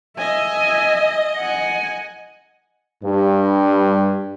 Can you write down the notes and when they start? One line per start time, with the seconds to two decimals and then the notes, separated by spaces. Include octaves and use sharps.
0.18 D#5 E5 G#5
1.37 F#5 G#5
3.04 G2